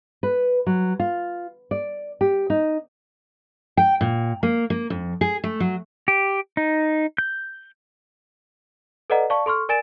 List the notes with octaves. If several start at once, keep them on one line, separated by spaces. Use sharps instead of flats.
B4
F#3
F4
D5
G4
D#4
G5
A#2
A#3
A#3
F2
G#4
A3
F#3
G4
D#4
G6
A4 B4 D5 D#5 F#5 A#5
D5 F5 A5 C#6
A4 C6 C#6 F6
A#4 D5 G#5 A6 D7 E7